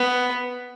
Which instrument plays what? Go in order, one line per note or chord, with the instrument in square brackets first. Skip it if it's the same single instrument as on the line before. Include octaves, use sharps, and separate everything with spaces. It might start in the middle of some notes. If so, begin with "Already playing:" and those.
Already playing: [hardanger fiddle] B3